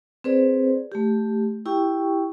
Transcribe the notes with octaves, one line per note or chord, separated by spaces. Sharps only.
C4 G#4 B4 C5 D5
A3 G4
E4 G4 G5 C#6